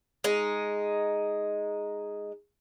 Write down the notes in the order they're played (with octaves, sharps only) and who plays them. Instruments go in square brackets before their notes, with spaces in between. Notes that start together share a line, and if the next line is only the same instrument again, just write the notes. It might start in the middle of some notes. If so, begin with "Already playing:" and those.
[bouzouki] G#3 D#4